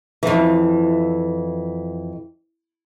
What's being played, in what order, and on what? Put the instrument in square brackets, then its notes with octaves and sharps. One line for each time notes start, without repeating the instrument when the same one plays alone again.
[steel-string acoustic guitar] F2 E3